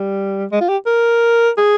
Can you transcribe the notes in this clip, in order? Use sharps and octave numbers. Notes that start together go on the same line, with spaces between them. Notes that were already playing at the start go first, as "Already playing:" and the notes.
Already playing: G3
G#3
F4
G4
A#4
G#4